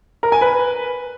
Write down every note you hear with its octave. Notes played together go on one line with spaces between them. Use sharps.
A#4
G#5
B4